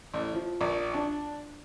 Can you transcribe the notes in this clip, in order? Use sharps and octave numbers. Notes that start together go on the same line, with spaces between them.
A1
F3
A#1
D4